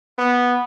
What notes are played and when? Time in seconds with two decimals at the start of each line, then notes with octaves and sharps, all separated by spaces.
0.18 B3